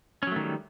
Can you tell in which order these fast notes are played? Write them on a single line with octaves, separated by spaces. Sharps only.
C#4 F#3 A3 D#3 G3